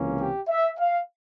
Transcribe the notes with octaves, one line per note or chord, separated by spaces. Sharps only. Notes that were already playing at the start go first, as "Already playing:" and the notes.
Already playing: C#2 C3 E3 A#3 C#4
G4
E5
F5